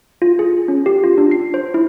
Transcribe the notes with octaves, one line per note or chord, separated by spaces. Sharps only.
F4
G#4
C#4
G4
F4
D4
C7
C5
E4